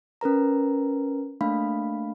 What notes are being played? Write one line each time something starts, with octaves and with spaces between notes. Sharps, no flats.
C#4 A#4 B4 A#5
A3 A#3 D4 F5 B5